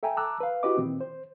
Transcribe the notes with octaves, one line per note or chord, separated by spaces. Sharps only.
A4 E5 G5 G#5 A#5
A5 A#5 D6 E6 F#6
B4 F5
E4 F#4 G4 B4 D#5 D6
A#2 D#3 C4
C5